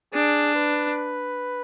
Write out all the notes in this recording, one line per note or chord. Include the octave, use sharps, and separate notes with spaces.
D4 G#4
B4